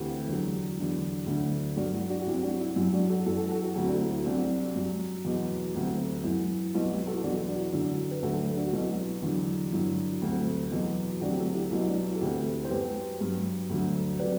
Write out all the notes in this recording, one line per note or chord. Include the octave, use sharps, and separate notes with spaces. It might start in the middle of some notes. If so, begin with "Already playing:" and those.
Already playing: D2 C3 E3 E4 G4
E2 D3 F#3
E2 D3 F#3
D2 D3 F#3
G2 F#3 D4 F#4
E4
D4 F#4
F#4
C2 C3 F#3 E4 G4
D4 F#4
F#4
E4
F#2 F#3 E4
D4 F#4
F#4 A4
F#2 E3 F#4 A4
F#4 A4
F#4 A4
F#4 A4
D2 C3 F#3 F#4 A4
D4 F#4
E4
E4
C2 C3 F#3 D4
F#2 F#3
E2 B2 F#3
D2 C3 F#3
F#2 E3 E4
C2 B2 F#3 E4
E4 G4
F#4 A4
E2 B2 F#3 D4 F#4
E4
D4
F#4
E4
F#2 D3 F#3 E4
B4
D2 D3 F#3 F#4 A4
D4 F#4
F#4
C2 B2 F#3 E4
E2 D3 F#3 E4
G2 D3 F#3 E4
D2 C3 F#3
E2 B2 F#3
D2 C3 F#3 D4 F#4
G4
F#4 A4
E4 G4
C2 B2 F#3 E4
E4
D4
E4
A4
D2 C3 E3 E4 G4
C5
F#2 F#3 G4 B4
G2 F#3
D2 D3 F#3
C3 F#3 B4 D5